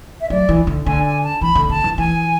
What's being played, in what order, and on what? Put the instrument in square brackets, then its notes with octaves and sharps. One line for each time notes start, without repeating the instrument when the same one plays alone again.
[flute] E5
[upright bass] F#3 [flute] D5
[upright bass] E3
D3
[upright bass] D3 [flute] G#5
[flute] G#5
A5
[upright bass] E3 [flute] B5
[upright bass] D3
[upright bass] D3 [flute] A5
[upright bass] E3
[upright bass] E3 [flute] G#5